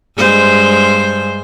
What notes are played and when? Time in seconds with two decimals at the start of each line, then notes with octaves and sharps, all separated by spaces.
0.17 G2 G#3 C5